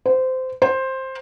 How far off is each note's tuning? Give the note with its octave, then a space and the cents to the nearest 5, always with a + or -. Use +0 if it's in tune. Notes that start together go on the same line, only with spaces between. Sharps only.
C5 -20
C5 +10